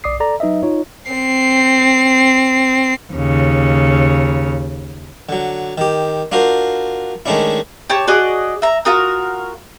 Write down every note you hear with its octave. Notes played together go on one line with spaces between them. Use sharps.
B1 D5 D6 D#6 C7
A4 D5 A#5
F#3 D#4 B4 D#5 E5
D#4 F4 C#5
C4 C7
D#2 C#3
D3 F#3
D#3 G4
D4 F4 F#4 A#4 C5
D#3 G#3 A3 C#4 D4 E4
G4 C#5 A5
F#4 G#4 D5 D#5
E5 A#5
F4 F#4 A#4 D#6